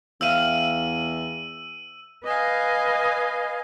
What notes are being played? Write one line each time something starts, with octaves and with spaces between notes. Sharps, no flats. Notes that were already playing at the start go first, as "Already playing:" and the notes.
E2 E5 F5 G5 E6 D#7
B4 D#5 F5 G#5